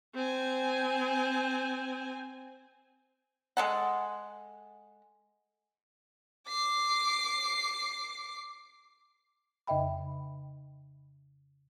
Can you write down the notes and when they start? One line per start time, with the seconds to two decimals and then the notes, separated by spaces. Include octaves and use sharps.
0.15 C4 G#5
3.57 G#3 A4 F#5
6.48 D6 C7
9.67 F2 C#3 D#5 E5 G5 B5